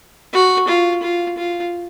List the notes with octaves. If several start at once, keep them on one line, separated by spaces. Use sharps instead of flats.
F#4
F4
F4
F4